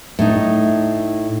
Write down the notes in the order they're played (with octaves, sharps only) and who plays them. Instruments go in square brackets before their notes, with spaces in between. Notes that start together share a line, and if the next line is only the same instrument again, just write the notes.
[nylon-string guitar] A2 D#4